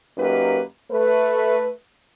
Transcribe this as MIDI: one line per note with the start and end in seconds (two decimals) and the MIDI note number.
0.18 0.62 42
0.18 0.62 58
0.18 0.62 63
0.18 0.62 67
0.18 0.62 71
0.92 1.71 57
0.92 1.71 71